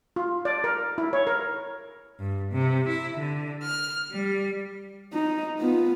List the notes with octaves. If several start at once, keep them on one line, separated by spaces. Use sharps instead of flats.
F4
D5
A#4
E4
C#5
A#4
G2
C3
E4
D3
F6
G3
D#4
B3 F4